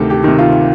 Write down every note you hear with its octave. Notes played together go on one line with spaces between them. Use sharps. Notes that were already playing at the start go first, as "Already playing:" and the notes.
Already playing: D2 C3 D#3 G4 A4
G4
C3 D#3
F4